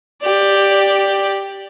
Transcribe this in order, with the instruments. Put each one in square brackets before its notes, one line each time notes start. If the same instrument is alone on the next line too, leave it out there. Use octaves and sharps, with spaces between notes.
[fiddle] G4 D5